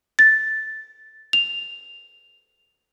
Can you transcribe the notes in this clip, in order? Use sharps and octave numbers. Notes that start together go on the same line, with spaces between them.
A6
F7